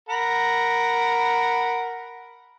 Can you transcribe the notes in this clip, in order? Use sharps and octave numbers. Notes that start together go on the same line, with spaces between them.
A#4 F#5 B5